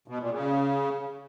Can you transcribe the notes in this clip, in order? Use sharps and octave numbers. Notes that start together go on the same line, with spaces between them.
B2
A#2
C#3